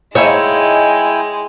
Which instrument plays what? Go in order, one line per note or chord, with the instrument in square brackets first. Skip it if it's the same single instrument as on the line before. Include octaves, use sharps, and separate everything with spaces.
[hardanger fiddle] G#3 [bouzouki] D#4 [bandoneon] E4 G5 G#5 [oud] C#5 E5